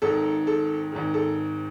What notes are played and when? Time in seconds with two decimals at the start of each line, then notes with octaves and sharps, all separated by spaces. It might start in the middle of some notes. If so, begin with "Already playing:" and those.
0.02 G#1 G#2 D#3 A4
0.47 A4
0.92 G#1 G#2 D#3
1.14 A4